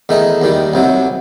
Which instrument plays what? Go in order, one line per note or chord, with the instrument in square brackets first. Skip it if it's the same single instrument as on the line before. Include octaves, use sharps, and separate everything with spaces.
[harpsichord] E2 D#3 A3 D#4
D#2 D#3 G3
C2 C3 F#3